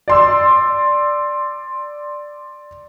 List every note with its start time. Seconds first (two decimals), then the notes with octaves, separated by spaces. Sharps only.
0.08 D5 C6 E6